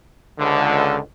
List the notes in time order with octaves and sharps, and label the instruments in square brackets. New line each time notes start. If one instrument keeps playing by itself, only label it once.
[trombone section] C#2 D3